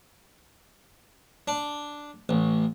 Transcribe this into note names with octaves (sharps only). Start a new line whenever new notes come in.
D4
A1